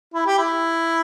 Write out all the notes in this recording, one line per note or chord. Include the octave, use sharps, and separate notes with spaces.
E4
G4
E4